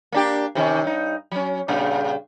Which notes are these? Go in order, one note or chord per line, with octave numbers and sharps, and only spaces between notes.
A#3 D4 G4
C3 D#3 C#4
G2 D#4
F#3 C#4
G2 A#2 C#3